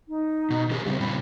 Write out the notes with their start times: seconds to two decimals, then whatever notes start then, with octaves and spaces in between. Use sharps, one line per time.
0.09 D#4
0.50 B2
0.71 D#3 D4 G4 G#4
0.86 C#3 G3 C4
1.00 A#2 C#3 G3 B5